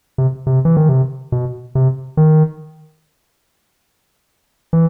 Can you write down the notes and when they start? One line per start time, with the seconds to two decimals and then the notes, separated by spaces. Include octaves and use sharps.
0.18 C3
0.47 C3
0.65 E3
0.77 D#3
0.89 C3
1.32 B2
1.75 C3
2.17 D#3
4.73 E3